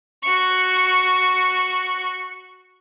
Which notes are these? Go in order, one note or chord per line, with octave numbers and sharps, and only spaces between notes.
F#4 C#6